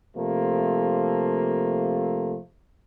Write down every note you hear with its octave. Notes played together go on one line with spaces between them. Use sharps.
C3 F3 A3 A#3